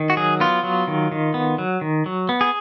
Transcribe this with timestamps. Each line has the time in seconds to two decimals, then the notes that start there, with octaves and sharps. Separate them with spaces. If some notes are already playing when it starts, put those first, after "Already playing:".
Already playing: D#3
0.10 F#4
0.17 F#3 G#4
0.40 B3 F4
0.63 F#3
0.87 D#3
1.12 D#3
1.34 B3
1.58 F#3
1.81 D#3
2.06 F#3
2.29 B3
2.41 G#4